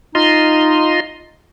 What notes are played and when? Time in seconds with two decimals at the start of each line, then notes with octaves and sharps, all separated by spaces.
0.15 D#4 F4 D#5 C6